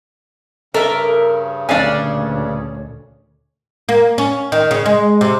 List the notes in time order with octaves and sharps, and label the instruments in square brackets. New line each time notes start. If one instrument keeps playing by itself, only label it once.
[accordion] G2 C#3 [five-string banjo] A4 [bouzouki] A#4 E5
[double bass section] D2 A#2 [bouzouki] C#4 D5 [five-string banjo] D4 F5 G#5
[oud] A#3
C#4
D#3
C#3
G#3
C3